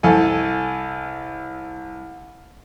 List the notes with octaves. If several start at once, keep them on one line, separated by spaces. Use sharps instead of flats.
C2 A4 G#5